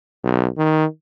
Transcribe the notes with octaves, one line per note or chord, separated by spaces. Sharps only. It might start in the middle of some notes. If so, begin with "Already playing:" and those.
B1
D#3